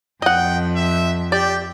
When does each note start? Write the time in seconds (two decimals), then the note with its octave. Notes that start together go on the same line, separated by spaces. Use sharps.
0.22 F2 D#5 F#5 G5
0.76 E5
1.32 G4 D5 G5